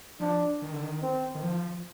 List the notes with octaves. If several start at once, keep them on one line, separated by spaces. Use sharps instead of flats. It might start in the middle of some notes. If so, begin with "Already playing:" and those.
F3 D4
D#3
D3
D#3
C4
D#3
F3